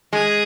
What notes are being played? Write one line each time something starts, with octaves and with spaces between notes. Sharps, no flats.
G#3 G#4